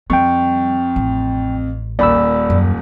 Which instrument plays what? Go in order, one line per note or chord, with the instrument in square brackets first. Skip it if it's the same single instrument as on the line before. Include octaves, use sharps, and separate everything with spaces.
[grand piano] F2 [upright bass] G3 [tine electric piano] G5 C#6
[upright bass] A1
[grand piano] D#1 A#2 [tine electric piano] D5 B5 E6
[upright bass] F#2